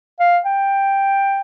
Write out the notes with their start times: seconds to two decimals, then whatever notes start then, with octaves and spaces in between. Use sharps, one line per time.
0.19 F5
0.46 G5